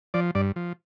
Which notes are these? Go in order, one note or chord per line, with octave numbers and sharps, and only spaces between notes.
F3 D5
G2 D5
F3